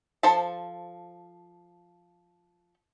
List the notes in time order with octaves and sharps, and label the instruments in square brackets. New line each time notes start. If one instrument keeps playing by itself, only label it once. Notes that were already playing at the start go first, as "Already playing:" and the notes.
[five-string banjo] F3 A4 C5 A5